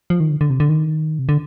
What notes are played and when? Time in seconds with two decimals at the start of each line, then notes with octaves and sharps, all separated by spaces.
0.10 F3
0.20 D#3
0.30 D3
0.41 D3
0.50 C3
0.60 D3
0.69 D#3
1.19 C3
1.29 D3